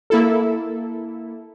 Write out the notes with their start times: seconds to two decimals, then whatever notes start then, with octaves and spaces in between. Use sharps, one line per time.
0.10 A#3 E4 A4